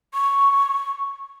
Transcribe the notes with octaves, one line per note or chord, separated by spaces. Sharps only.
C#6